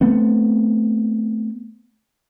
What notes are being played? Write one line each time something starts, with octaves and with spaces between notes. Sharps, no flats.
A3 B3 C4